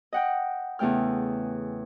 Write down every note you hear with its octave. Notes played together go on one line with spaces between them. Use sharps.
D#5 F#5 G5
E2 C#3 A3 G5 F6